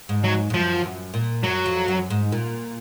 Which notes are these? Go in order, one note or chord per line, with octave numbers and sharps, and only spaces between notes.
G#2
F#3
G#2
F#2 F3
F#2
A#2
F#2 F#3
F2
F#2
G#2
A#2